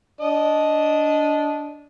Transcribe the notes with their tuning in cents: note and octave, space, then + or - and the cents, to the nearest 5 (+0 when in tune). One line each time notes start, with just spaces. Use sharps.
D4 -15 D#5 +0